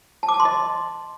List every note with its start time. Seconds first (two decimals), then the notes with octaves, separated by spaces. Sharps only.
0.23 A5
0.29 D6
0.34 A5
0.40 C6
0.45 D#5